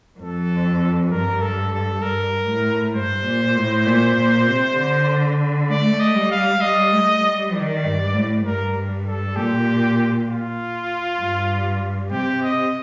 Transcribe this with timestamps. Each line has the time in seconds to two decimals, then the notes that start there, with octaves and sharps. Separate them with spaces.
0.19 F2 A4
1.11 G2 A#4
1.41 A4
1.73 A4
2.02 G2 A#4
2.49 A2
2.94 G2 C5
3.25 A#2
3.56 A2
3.86 A#2
4.17 A#2
4.47 C3
4.77 D3
5.69 A3 D5
6.00 D#5
6.15 G3
6.31 F5
6.61 G3 D#5
6.92 A3
7.22 G3
7.53 D#3 D5
7.84 G2
8.14 A2
8.45 G2 A#4
9.06 A4
9.36 A#2 G4
10.28 F4
11.20 G2
12.11 C3 G4
12.42 D#5